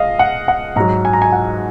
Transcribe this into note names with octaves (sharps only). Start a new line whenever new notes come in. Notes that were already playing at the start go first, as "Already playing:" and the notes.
Already playing: G#3 D#5 F5
F#5
F#5
G#2 F#3 A#5
G#5
A#5
G#5
F#5